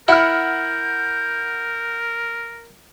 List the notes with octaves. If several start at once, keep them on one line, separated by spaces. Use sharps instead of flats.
E4 A#4 F#5 F6 G6